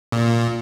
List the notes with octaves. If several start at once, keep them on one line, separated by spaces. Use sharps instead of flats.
A#2